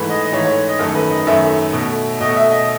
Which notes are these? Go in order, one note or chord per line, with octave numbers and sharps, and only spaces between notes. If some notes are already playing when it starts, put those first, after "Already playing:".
Already playing: G#2 E3 A3 B4
D#5
D#5
G#2 E3 A3 C#5
C#5
D#5
F#2 D#3 A3 A4
B4
D#5
F#2 D#3 A3 E5
B2 A3
B2 A3 D#5
E5
D#5